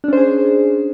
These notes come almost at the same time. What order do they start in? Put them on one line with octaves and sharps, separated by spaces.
D4 C#4 C5 G#4